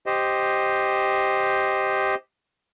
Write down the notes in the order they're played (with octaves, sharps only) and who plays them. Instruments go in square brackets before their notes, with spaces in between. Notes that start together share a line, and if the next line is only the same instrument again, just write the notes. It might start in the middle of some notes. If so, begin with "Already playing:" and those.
[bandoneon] G4 C5 D#5